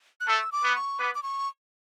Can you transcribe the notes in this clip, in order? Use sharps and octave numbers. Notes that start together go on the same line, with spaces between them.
F#6
A3 A4 E6
D6
B3 B4
C#6
B3 B4 D6
D6
C#6